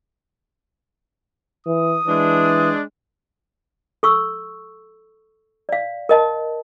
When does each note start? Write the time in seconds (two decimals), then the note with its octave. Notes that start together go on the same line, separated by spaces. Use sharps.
1.66 E3 D#6
2.07 E3 G#3 D4
4.03 A4 C#6 E6
5.69 D5 F5
6.09 A#4 D#5 A5